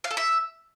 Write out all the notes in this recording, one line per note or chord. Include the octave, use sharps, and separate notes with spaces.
F5
A4
E5